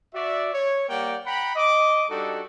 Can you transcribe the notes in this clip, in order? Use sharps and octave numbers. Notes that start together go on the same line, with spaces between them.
F#4 D5 E5
C#5
G3 A#3 A#4 D5 F#5 G5
F#5 G5 A#5 B5
D#5 D6
G3 D4 D#4 F#4 A4